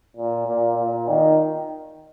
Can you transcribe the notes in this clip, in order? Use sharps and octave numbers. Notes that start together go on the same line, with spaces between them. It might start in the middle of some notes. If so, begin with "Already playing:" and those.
A#2
A#2
A#2
D#3